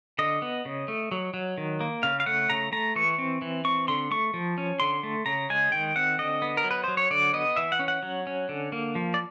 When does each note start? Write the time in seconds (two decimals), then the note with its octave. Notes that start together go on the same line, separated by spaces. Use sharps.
0.19 D3 D#5
0.42 B3
0.65 C#3
0.88 A3
1.12 F#3
1.34 F#3
1.58 D#3
1.81 A#3
2.03 C#3 F5
2.20 F5
2.26 A3 F#5
2.50 C#3 A#5
2.72 A3 A#5
2.96 E3 C#6
3.18 C4
3.42 E3
3.65 C4 C#6
3.88 D3 C6
4.11 A3 C#6
4.34 F3
4.58 C#4
4.80 D3 C6
5.03 A3
5.26 C#3 A#5
5.50 G#3 G#5
5.72 D#3 G5
5.96 C4 F#5
6.18 D3 D#5
6.42 B3
6.57 A#4
6.64 F#3
6.71 B4
6.84 F#3 C5
6.97 C#5
7.11 D3 D5
7.33 B3 D#5
7.56 E3 E5
7.72 F#5
7.79 C#4
7.88 F#5
8.03 F#3
8.27 C#4
8.49 D3
8.72 A#3
8.95 F3
9.14 D5